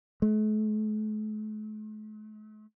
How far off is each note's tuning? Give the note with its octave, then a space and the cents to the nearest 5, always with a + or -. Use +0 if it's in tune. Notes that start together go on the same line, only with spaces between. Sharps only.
A3 -45